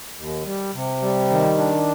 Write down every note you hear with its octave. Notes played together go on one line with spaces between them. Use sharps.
D#2
G3
C3
G3
D#3
D4